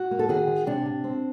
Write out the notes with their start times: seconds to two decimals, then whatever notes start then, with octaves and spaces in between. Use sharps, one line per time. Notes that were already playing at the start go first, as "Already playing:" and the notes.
Already playing: F#4
0.11 A#3
0.19 A4
0.29 D#3 F#4 G#4
0.48 D#3
0.67 C3 D4
0.86 C3
1.04 C4